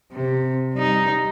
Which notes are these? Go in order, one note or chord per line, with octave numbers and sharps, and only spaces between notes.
C3
G3 D#4